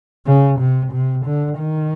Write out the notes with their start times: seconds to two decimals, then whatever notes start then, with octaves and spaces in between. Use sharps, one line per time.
0.26 C#3
0.60 C3
0.92 C3
1.25 D3
1.58 D#3